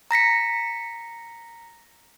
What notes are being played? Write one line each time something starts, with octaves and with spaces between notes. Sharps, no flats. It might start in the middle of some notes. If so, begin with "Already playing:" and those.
A#5 A#6 B6 C#7